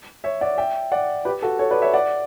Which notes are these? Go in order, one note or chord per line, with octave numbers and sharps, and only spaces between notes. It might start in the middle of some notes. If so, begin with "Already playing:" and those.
C#5 E5
D5 F#5
E5 G5
D5 F#5
G4 B4
F#4 A4
A4 C#5
B4 D5
C#5 E5
D5 F#5